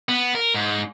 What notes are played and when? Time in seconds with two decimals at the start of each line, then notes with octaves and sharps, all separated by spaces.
0.09 B3
0.35 A#4
0.54 G#2